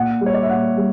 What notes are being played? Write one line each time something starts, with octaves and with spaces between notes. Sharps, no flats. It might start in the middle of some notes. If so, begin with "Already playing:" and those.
Already playing: A#2 F#5
G3
C#5
D5
E5
A#2 F#5
G3